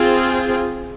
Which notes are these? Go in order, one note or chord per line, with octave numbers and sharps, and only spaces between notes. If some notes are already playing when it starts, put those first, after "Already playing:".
Already playing: C4 F4 G#4